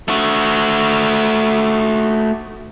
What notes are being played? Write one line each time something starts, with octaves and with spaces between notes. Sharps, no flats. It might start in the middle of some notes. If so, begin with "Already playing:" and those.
A3 F#4